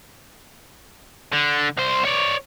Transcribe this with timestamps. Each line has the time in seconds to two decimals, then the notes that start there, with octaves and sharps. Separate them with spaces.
1.33 D3
1.78 C2 C5
2.05 C#5 D5